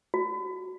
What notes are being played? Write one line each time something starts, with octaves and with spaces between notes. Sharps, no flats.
F#4